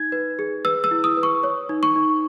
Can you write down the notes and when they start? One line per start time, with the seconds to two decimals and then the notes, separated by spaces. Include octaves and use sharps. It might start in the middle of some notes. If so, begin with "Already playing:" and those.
Already playing: D#4 G#6
0.12 B4
0.39 G#4
0.65 B4 E6
0.84 E6
0.91 E4
1.04 D#6
1.17 B4
1.23 C#6
1.43 C#5
1.69 D#4
1.83 C#6
1.96 D#4